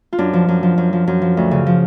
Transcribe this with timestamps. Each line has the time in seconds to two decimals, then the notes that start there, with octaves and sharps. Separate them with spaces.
0.13 F4
0.18 F#2 D4
0.33 F3
0.48 F#2
0.63 F3
0.78 F#2
0.93 F3
1.07 F#2
1.22 F3
1.37 D2
1.51 C#3
1.66 F3